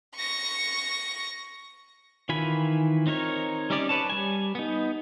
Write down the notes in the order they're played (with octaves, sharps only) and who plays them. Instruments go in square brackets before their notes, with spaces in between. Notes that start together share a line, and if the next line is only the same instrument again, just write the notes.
[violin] C#6 A#6
[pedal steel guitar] D#3 E3 F4 G#5 B5
C4 D#4 A#4 C#5
G3 C#4 D#4 G4 D5
B4 C#5 A5
G3 G#5
B3 D#4